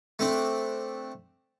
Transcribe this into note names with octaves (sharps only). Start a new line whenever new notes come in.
A3 C4 D4